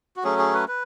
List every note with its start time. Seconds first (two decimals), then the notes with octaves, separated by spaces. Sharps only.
0.16 F#4
0.24 F#3 A3 C#4 G#4
0.39 G#4
0.54 B4
0.68 B4